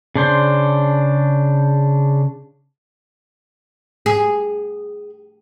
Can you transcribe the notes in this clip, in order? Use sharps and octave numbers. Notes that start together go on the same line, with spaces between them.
C#3 D4 C5
G#4